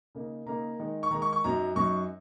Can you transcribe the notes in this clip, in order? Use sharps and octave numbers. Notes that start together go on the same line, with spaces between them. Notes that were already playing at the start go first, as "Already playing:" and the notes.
C#3 A#3 D#4
C#3 A#3 D#4 A#5
D#3 G#3 D#4
C#6
D#3 G#3 D#4 A#5
C#6
C#6
F#2 F#3 D#4 A#5
F#2 F#3 D#4 C#6